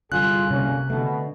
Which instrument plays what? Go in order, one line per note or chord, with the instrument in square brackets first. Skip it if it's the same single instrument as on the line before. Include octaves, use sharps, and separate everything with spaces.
[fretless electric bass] C2 G2 D3 [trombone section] F4 G#4 [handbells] F#6
[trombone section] D2 A#3 C#4 [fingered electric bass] C3
[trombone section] B2 [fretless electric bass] D3 A3